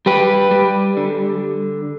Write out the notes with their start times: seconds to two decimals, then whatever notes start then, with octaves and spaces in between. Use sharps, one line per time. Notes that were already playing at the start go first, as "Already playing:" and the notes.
0.06 G3 G4 B4
0.51 G3
0.97 D3